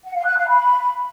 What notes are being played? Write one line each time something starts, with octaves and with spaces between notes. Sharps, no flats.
F#5
F5
F#6
F5
B5